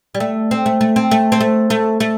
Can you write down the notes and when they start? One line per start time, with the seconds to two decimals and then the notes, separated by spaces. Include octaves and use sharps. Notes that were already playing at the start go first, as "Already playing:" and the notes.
0.15 G3
0.20 A3
0.51 C4
0.66 A3
0.81 A3
0.96 C4
1.11 A3
1.32 C4
1.40 A3
1.70 A3
2.00 A3